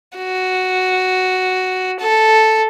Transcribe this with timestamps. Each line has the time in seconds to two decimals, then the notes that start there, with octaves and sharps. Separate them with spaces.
0.17 F#4
2.00 A4